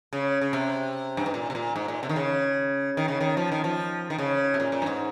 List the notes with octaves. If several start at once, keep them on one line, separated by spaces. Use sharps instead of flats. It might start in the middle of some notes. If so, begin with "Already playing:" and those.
C#3
C#3
C3
G2
G#2
A#2
C3
A#2
G#2
A#2
C3
D#3
C#3
D#3
C#3
D#3
F3
D#3
F3
D#3
C#3
C3
A#2
A#2
G2
G#2